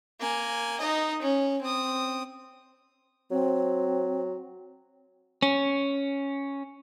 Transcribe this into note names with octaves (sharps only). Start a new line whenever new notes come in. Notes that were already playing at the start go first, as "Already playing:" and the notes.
A#3 G#5
D#4 D#5
C#4
C4 D#6
F#3 C4
C#4